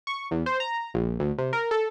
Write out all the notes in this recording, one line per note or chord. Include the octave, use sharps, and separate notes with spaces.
C#6
E2
C5
A#5
A#1
D2
C3
A#4
A4